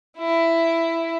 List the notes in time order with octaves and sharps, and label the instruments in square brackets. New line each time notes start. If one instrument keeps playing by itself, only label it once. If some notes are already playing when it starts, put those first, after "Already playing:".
[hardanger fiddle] E4